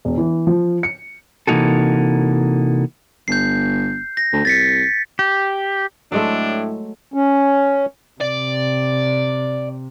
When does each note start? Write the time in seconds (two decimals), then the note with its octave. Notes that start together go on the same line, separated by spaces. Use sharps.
0.05 E1
0.18 E3
0.47 F3
0.83 C#7
1.47 C3 E3 A#3 D#4 F#4 A4
3.28 G1 G6 C7
4.17 A#6
4.33 D2
4.45 C2 A6 B6 C#7
5.19 G4
6.12 A2 F#3 G#3 A3 D4
7.14 C#4
8.21 C3 D5